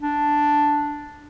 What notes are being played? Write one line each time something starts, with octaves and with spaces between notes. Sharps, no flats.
D4